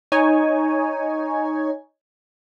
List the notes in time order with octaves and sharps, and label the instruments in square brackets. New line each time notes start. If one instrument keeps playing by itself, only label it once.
[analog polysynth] D#4 C#5 G#5